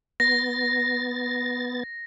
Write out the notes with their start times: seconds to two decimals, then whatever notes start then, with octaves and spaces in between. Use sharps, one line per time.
0.20 B3 A6 A#6